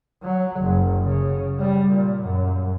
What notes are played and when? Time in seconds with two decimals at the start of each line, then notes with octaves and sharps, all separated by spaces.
0.23 F#3
0.61 F#1
1.04 C#3
1.59 G3
1.90 A#2
2.23 F#2